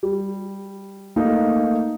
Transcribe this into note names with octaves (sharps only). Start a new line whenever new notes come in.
G3
A3 A#3 D#4